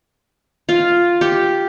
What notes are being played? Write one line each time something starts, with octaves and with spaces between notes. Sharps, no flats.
F4
G4